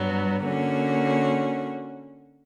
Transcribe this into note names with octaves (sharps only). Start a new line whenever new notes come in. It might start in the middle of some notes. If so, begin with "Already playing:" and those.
Already playing: G2 F#3 B3
D3 A#3 C#4 F#4